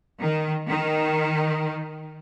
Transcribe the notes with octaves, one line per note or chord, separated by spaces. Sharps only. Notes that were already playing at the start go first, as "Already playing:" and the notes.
D#3
D#3